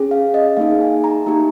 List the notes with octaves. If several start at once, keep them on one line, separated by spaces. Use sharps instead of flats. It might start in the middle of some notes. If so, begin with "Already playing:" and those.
Already playing: C#4 G#4
F5
D#5
A#3 D#4 G#4 F5
G#5
A#5
A#3 D#4 G4